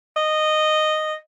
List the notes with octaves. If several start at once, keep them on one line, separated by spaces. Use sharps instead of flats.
D#5